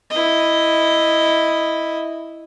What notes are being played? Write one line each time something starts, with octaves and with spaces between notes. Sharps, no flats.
E4 D#5